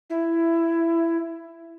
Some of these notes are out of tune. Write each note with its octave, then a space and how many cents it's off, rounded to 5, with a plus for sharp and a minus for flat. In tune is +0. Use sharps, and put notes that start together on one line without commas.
E4 +15